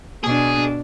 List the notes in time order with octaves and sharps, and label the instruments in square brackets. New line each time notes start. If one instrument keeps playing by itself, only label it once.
[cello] B2 D4 [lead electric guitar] G#4